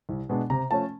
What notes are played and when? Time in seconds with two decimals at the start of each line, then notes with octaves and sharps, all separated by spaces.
0.09 C2
0.29 B2 G#3 B3 D4
0.50 C3 A#5
0.71 F3 A3 C#4 A5